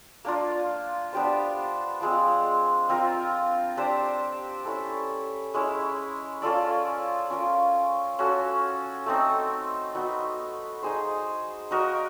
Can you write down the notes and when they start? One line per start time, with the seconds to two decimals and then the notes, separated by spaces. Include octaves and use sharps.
0.25 A#3 D4 F4
1.13 B3 D4 G4 C5
2.01 F3 G#3 C4
2.89 C4 F4 A#4
3.77 D4 G4 C5 E5
4.65 C#4 E4 A4
5.54 G#3 C#4 E4
6.42 C#4 F4 A4 D5
7.30 C#4 F4 A#4
8.19 C#4 F#4 A4
9.06 A3 C4 D#4
9.95 B3 D#4 F#4
10.83 D#4 G#4 C5
11.71 D#4 F#4 A#4 D#5